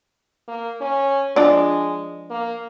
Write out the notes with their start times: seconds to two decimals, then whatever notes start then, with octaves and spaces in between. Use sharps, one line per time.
0.48 A#3
0.81 C#4
1.36 F3 G#3 D4 D5
2.30 A#3